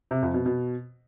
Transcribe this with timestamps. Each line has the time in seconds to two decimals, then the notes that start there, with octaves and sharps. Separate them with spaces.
0.11 C3
0.22 F2
0.34 B2
0.46 B2